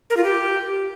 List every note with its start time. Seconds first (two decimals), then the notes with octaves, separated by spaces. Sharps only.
0.10 A#4
0.17 F4
0.24 G4